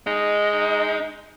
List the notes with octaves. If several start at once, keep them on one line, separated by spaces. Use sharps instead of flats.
G#3 D#4